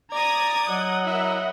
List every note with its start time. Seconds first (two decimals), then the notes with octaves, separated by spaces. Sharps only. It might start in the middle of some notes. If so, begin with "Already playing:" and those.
0.12 D5 A#5 D#6 G#6 A#6
0.68 F#3 D#5 F#5
1.07 E4 A#4 E5